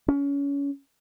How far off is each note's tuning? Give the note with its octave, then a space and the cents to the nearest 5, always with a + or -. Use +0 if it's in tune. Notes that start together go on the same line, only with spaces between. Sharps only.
C#4 +25